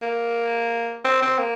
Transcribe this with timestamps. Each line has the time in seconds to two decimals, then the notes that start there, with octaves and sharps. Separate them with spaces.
0.02 A#3
1.04 C4
1.22 C4
1.38 A#3